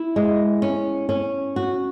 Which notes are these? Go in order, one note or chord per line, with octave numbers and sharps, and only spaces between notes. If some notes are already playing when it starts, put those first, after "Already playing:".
Already playing: E4
G#3
C#4
C#4
F#4